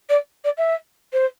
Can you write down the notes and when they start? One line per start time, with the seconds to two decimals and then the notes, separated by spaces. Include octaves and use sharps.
0.09 D5
0.44 D5
0.57 E5
1.13 C5